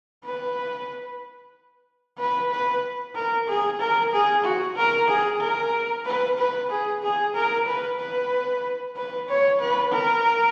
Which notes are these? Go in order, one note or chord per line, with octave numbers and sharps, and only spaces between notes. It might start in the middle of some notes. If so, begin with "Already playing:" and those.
B4
B4
B4
A#4
G#4
A#4
G#4
F#4
A#4
G#4
A#4
B4
B4
G#4
G#4
A#4
B4
B4
B4
C#5
B4
A#4